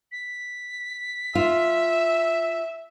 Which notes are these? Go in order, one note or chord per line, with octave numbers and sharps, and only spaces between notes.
B6
F4 E5